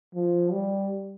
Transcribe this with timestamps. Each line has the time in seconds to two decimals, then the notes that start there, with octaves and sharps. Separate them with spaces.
0.15 F3
0.52 G3